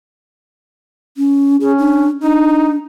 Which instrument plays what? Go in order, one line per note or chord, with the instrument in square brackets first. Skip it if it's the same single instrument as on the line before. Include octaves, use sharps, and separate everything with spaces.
[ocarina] C#4
[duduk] C#4 [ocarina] G#4
[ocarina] D4
[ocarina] D4 [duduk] D#4